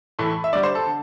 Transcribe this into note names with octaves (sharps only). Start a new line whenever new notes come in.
A2 E3 A3
E5
D3 G3 D5
C5
A4
D3